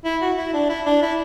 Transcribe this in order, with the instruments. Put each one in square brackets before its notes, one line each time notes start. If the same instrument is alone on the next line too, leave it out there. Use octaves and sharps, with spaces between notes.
[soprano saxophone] E4
F#4
E4
D4
E4
D4
E4